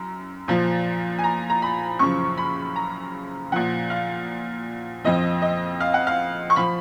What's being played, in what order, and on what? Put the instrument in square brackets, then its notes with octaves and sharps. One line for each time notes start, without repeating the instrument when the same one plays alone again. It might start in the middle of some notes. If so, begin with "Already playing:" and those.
Already playing: [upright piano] F#2 A#5
A#2 F3
G#5
A#5
A#5
B5
F#2 C#3 F3 C#6
B5
A#5
A#2 F3 F#5
F5
F2 F3 D#5
D#5
F5
F#5
F5
C#6
F3 B5